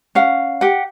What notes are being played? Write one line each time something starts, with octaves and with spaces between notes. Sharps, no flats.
C#4 F5 F#5
G4 F#5